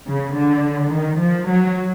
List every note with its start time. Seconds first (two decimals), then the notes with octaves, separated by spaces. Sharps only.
0.08 C#3
0.36 D3
0.93 D#3
1.21 F3
1.50 F#3